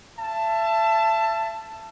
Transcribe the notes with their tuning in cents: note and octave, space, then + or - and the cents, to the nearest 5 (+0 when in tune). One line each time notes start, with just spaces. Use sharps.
E5 +30 A5 +5